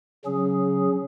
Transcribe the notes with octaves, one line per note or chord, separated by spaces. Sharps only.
C#3 F#3 C#4 G#4